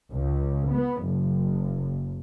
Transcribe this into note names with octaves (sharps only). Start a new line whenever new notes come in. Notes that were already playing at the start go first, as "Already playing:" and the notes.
C#2
B3
F#1